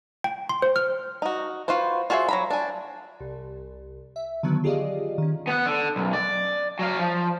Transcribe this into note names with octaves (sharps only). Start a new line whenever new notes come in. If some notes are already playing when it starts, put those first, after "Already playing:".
G5
C6
C5
F6
D#4 F#4
F4 F#4 B4 C5
F4 F#4 G#4 C5 E5
F#3 A#5 B5
D4 G#5
C2
E5
D3 D#3 F#3 B3
F4 G4 G#4 D5 D#5 F5
D#3 C#4
B3 F#5
D3
B1 F#2
D5
F#3 F5
F3